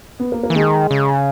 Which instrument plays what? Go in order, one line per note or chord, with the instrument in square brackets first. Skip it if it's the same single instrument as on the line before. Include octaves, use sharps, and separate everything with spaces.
[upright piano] B3
A#3
A#3
[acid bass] E3
[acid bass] D#3 [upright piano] G#3
[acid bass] C#3